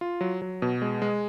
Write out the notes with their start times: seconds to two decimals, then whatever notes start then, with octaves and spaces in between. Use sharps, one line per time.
0.01 F4
0.21 F#3
0.42 F#3
0.62 B2
0.82 G#3
1.02 G#3